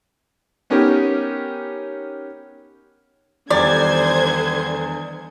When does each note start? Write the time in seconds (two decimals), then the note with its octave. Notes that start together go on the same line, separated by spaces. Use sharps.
0.70 B3 C#4 D#4 G4 A#4
3.50 E2 D3 D#3 G3 C5 D5 G#6